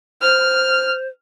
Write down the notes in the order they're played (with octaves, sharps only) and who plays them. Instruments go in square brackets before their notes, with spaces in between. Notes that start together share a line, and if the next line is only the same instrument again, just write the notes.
[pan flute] C5 [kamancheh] F6